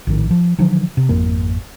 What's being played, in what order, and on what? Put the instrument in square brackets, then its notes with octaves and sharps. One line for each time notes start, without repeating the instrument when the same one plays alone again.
[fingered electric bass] A#1 A2 D#3
F3
D3 D#3 F3 F#3
C3
G#1 F2 A#3